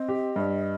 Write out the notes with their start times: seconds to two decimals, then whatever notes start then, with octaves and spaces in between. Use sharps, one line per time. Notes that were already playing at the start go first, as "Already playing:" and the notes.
Already playing: C4 D#5
0.09 G4
0.36 G2